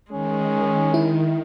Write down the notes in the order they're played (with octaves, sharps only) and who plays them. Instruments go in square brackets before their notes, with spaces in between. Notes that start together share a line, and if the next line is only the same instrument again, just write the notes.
[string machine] D#3 [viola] G#3 [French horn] C#4
[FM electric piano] E4